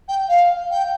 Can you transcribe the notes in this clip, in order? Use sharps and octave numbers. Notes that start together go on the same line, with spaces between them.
G5
F5
G5